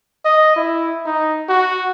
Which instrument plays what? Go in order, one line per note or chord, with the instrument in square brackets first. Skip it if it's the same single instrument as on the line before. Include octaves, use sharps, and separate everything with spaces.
[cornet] D#5
E4
D#4
F#4